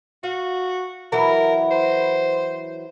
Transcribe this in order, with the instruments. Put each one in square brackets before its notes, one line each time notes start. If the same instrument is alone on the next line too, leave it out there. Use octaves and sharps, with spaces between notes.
[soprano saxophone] F#4 [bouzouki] F5
[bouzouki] E3 F#3 E4 [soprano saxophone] A#4
[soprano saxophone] C5